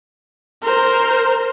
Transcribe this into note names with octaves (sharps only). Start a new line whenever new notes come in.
A#4 C5